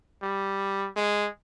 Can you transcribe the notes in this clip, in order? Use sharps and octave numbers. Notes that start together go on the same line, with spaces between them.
G3
G#3